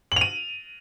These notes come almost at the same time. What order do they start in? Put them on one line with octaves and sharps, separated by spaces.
F#7 F7 D#7